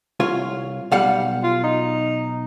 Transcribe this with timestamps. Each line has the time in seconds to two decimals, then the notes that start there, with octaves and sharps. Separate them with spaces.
0.20 C2 F4 C#5
0.92 B1 G3 F5 F#5
1.44 F4
1.64 D#4